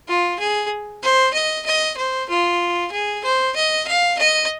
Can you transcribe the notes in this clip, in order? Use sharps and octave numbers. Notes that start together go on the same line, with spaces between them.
F4
G#4
C5
D#5
D#5
C5
F4
G#4
C5
D#5
F5
D#5